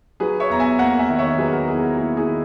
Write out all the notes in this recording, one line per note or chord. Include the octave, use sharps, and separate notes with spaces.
F#3 G#4 B4
C#5 E5
E2 A#5
E5 G#5
A#3 F#5 A#5
E5 G#5
D#3
C#5 E5
F#3 G#4 B4
F#4 A#4
E2 E4 G#4
F#4 A#4
A#3 E4 G#4
E4 G#4
D#3